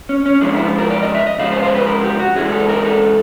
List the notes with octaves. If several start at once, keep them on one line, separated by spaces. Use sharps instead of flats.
C#4
C#4
C#3 F3 G#3 D4
E4
F4
A#4
D5
D#5
E5
D#5
C#3 F3 G#3 F5
C5
C5
B4
A#4
G4
F#4
C#3 E3 G#3 G#4
A4
A#4
A4